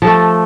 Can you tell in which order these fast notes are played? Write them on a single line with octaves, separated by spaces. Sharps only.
F3 A4 A3